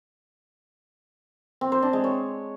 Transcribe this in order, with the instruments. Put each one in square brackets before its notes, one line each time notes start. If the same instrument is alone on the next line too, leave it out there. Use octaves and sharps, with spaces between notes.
[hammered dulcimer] C4
C5
D4
G#3
C#5